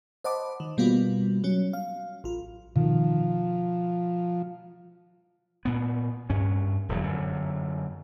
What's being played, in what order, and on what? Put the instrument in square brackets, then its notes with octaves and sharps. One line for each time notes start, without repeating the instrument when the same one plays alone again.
[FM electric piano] C5 D#5 F#5 A5 B5 D6
D#3
B2 G3 A#3 B3 F4 F#4
F#3 C#4
F5
A1 F4
[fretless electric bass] B2 D#3 [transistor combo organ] F3
[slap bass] A#2 B3
G2 C#4
D#1 E2 F#3
F#2 D3